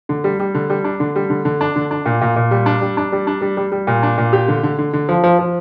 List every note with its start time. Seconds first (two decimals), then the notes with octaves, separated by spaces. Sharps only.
0.09 D3
0.24 G3
0.40 G3
0.54 D3
0.70 G3
0.84 D4
1.00 D3
1.16 G3
1.30 D3
1.45 D3
1.61 D4
1.76 D3
1.91 D4
2.06 A#2
2.21 A#2
2.36 A#2
2.51 G3
2.66 D4
2.81 G3
2.97 D4
3.12 G3
3.27 D4
3.41 G3
3.57 G3
3.72 G3
3.87 A#2
4.03 D4
4.18 A#2
4.33 G4
4.48 D3
4.63 D3
4.78 D3
4.93 D3
5.09 F3
5.24 F3
5.39 F3